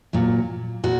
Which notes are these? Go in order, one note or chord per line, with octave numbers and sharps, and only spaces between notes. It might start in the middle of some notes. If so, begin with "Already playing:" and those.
A#2 F#3
A#2 F#4